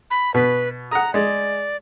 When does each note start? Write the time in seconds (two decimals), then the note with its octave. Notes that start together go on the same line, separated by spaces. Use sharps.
0.11 B5
0.34 B2 B4
0.91 F#5 A#5 D#6
1.14 G#3 D5